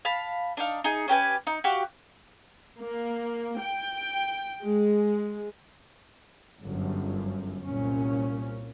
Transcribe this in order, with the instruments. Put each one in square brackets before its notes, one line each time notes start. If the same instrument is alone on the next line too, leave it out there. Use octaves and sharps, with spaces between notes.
[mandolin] F5 A5 B5
D4 D#4 F5
D#4 G#4
C#4 G4 B4 G#5
D#4
F#4 G4 F5
[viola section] A#3
G5
G#3
[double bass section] G1 F#2
C2 A#2 C#4